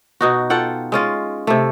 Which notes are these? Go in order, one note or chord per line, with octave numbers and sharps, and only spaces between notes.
B2 D#4 F#4
F4 A4 F#5 G5
G#3 C#4 F4
C3 A3